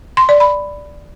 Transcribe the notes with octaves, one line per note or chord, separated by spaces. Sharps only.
C6
D5
B5